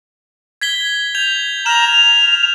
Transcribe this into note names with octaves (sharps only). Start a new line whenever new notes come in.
G#6 B6 G7
G6 G#6 F7
A#5 F6 E7 F#7
F7